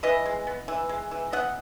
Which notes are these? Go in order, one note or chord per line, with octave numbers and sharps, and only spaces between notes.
E3 B4 D#5
G#3
B3
E3
G#3
E3
B3 D#5 F#5